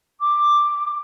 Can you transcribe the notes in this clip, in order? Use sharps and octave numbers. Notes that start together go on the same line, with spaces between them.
D6